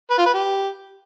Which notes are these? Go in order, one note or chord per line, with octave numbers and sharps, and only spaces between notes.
B4
F4
B4
G4